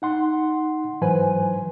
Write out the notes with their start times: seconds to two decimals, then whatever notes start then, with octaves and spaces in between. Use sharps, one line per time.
0.02 D#4 F#5 C6
1.01 G#2 E3 F#3 B4 C5 G#5